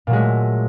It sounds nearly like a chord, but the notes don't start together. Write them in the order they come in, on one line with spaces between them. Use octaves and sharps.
A#2 F#3 G#3 A3